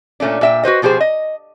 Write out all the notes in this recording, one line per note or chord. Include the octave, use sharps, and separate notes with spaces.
A#2 A3 C#4 D4
A#2 E5 G5
F#4 B4 C5 D#5
B2 F3 G4 G#4 C5
D#5